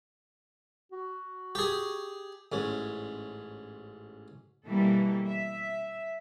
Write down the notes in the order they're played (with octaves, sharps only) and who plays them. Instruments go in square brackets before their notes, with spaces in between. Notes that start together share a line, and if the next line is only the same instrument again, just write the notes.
[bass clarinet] F#4
[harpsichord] G4 G#4
A1 G#2 C#4
[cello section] B2 E3 G3 A#3 A4
E5